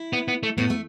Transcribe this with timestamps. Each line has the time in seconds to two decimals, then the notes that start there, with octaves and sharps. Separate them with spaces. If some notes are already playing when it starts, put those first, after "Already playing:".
Already playing: E4
0.13 B3
0.28 B3
0.43 A3
0.57 A2 B3
0.70 A3